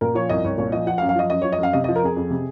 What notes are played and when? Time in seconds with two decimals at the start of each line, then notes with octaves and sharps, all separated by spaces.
0.01 A#2 A#4
0.15 F3 C#5
0.29 C2 D#5
0.44 C2 C#5
0.58 A#2 C#5
0.72 F3 D#5
0.87 F3 F#5
0.98 F5
1.02 F#2
1.09 F5
1.15 F3 D#5
1.30 F#2 D#5
1.42 F3 C#5
1.52 D#5
1.58 F#2 F5
1.73 C3 D#5
1.84 F3 D#5
1.96 A#4
2.03 F2 G#4
2.17 F2
2.30 C3